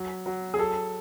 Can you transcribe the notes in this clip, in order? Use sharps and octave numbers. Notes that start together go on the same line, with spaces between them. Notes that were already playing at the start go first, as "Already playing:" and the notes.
Already playing: F#3
F#3
G#4
F#3 A4